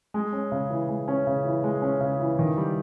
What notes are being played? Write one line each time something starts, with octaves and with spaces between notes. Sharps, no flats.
G#3
C#4
C#3
E3
G#3
C#4
C#3
E3
G#3
C#4
C#3
E3
D#3
G3